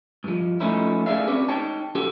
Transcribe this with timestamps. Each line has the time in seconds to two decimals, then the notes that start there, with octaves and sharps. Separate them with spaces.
0.24 G2 F3
0.60 F3 A3 C#4 D#4 E4
1.06 A3 G#4 B4 D5 E5 F5
1.27 C4 C#4 F#4 B4 C#5 D5
1.48 D#4 C#5 G5 A5
1.95 B1 C#4 F#4 G4 A4